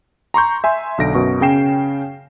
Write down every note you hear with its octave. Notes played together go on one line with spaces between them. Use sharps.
A#5 C6 C#6 G6
E5 G#5 C6
B1 D3 A#6 D7
F#2 B2 C#6
C#3 C#4 G5 C7 E7